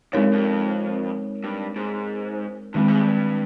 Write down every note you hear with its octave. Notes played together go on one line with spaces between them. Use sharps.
F2 G#3 C4 D#4 A#4 C#5
F2
G2
G#2
G2 D#3 G#3 C4
G#2
G2